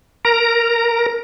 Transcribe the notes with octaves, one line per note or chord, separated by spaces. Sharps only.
A#4 A#5